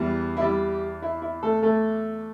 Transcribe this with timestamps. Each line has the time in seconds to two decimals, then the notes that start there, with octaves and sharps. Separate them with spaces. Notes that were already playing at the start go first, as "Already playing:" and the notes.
Already playing: E2 E3 G3
0.37 E4
0.41 G3 G4
1.02 E4
1.22 E4
1.43 A3 A4
1.63 A3 A4